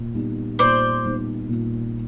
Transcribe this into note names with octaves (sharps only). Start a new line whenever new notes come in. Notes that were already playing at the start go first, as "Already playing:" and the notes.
Already playing: A#2
G3 B3 D#4
A#2 C5 D5
G3 B3 D#4
A#2